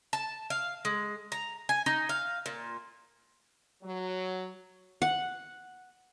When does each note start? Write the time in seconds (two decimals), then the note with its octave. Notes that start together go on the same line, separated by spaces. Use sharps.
0.13 A5
0.50 F5
0.85 G#3
1.32 A#5
1.69 G#5
1.86 D#4
2.09 F5
2.46 A#2
3.83 F#3
5.02 F#5